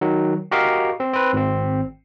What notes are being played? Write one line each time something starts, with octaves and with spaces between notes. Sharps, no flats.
D#3 F#3
F#4 G4 A#4 D#5 F5
C4
C4 B4
G#1 C4